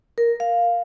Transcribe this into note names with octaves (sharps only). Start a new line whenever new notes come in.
A#4
F5